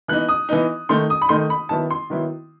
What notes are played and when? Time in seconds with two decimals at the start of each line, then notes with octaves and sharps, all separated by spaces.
0.08 E3 B3 D#4 F#6
0.29 D#6
0.49 E3 B3 D#4
0.89 D#3 A3 D#4 C6
1.10 D#6
1.22 B5
1.29 D#3 A3 D#4 C6
1.50 B5
1.69 D#3 F#3 B3 E4 A5
1.90 C6
2.10 D#3 F#3 B3 E4